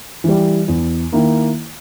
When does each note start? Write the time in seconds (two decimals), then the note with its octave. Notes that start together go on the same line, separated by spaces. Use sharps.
0.24 E3 G3
0.68 E2
1.12 D#3 A#3 E4